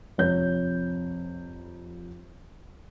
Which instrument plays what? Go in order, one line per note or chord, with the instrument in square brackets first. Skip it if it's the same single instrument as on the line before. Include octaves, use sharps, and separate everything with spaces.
[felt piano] F2 C3 C#5 G6